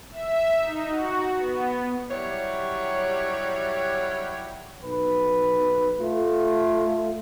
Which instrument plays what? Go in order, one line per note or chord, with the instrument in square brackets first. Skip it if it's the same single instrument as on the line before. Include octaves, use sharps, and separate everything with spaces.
[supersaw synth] E5
D#4
F#4
B3
[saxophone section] F#3 G3 E4 G4 C#5
[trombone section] B1 B4
A3 F4